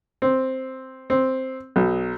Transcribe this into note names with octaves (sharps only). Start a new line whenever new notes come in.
C4
C4
B1